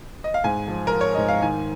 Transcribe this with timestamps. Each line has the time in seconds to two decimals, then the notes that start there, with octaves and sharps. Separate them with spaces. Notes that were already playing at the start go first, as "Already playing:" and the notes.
0.24 D#5
0.34 F5
0.44 G#2 G#5
0.68 F3
0.87 A#4
0.93 F3
1.01 C#5
1.14 G#2 D#5
1.28 F5
1.42 D#3 G#5